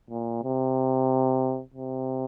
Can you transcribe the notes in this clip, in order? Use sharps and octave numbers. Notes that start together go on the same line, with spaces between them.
A#2
C3
C3